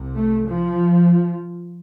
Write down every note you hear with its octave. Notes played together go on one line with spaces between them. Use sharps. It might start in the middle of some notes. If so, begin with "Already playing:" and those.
Already playing: C2 C3
A3
F3